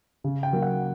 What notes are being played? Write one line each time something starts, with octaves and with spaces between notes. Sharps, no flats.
C#3
G5
F#3 A#3
F#5